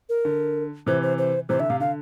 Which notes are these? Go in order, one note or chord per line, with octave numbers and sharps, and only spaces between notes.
A#4
D3
C3 E3 C5
C5
C5
C3 E3 C5
D3 E5
C3 F5
D3 F5